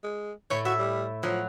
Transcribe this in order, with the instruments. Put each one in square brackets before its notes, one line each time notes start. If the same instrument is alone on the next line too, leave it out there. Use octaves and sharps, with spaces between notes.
[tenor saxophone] G#3
[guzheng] A2 A3 [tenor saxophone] C#5
[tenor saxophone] F#4 [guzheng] E5
[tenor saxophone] G3
[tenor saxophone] F3 [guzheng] F#3